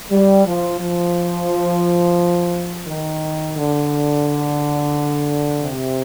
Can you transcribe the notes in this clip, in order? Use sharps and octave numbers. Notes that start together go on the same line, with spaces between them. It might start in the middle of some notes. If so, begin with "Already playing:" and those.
G3
F3
F3
D#3
D3
C3